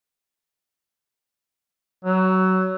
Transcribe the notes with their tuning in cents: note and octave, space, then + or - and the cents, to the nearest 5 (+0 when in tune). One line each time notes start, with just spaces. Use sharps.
F#3 +20